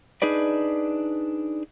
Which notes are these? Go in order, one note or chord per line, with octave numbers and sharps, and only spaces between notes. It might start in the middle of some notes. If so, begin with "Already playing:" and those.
D4 D#4 G#4 B4 D5